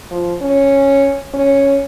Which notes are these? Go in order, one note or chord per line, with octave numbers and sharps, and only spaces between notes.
F3
C#4
C#4